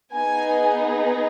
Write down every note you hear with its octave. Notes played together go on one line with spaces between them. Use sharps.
B3 D#4 G#4 G#5